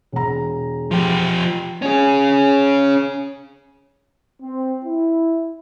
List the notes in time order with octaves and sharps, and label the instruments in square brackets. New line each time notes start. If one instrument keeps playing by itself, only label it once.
[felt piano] E1 A#5
[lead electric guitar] F3 G4
C#4 G#4
[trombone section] C4
E4